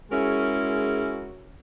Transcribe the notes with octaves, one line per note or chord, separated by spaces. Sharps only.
G#3 C#4 E4 F#4 G#4 A#4